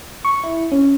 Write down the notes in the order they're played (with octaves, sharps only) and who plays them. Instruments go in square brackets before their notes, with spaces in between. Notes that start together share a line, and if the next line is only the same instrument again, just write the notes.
[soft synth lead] C#6
E4
C#4